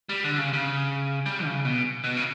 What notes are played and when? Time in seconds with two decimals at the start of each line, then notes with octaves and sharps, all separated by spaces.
0.09 G3
0.24 D3
0.39 C#3
0.53 C#3
1.26 G3
1.45 C#3
1.65 B2
2.04 B2
2.17 C#3